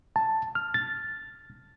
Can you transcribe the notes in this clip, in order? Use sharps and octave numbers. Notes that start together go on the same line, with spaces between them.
A5
F6
A6